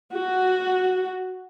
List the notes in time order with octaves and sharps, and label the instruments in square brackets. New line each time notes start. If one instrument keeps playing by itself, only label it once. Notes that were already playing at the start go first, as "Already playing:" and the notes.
[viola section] F#4